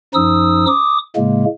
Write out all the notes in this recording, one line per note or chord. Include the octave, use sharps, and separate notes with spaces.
F#2 F3 D#4 D#6 E6
D6 D#6
A2 C#3 G#3 A#3